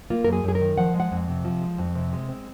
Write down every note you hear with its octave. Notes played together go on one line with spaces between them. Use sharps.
A#3 F4
F#2 A#4
G#4
F#2 G#4
A#4
D#3
F3 F#5
G#3
F#5
F2
C3
F3
G#3
F2
C3
G#3
C4